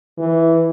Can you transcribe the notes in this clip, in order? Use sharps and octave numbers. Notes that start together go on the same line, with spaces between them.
E3